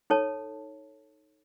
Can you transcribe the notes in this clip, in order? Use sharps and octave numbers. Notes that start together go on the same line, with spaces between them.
D#4 A4 C#5 A5